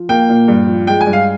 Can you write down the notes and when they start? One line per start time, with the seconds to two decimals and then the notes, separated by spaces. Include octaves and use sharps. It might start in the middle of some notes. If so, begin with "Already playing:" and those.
Already playing: F3
0.09 A#3 G5
0.29 A#2
0.48 G2
0.67 F3
0.87 G#3 G5
1.01 G#5
1.06 G2
1.13 F5